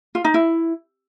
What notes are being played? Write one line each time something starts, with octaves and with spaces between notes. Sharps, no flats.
F4
D#4
E4